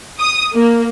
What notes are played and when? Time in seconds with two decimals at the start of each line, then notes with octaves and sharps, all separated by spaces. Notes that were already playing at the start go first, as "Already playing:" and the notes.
0.19 D#6
0.55 A#3